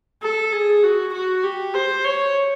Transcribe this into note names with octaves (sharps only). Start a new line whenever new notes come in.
A4
G#4
F#4
F#4
G4
C5
C#5